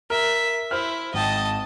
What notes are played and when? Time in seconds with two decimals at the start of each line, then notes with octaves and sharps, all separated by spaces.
0.10 A#4 E5
0.71 E4 C5 F6
1.14 G#1 D#5 G5 A5